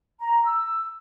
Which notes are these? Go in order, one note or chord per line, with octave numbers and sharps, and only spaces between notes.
A#5
E6